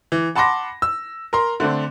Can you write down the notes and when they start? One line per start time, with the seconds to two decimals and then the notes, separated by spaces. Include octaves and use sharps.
0.12 E3
0.35 F#5 A5 B5 C6 D6 A#6
0.82 E6
1.33 A#4 A#5 C6
1.60 D3 A3 C4 D4